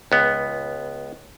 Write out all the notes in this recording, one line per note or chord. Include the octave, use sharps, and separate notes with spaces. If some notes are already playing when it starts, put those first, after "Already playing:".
C#2 B3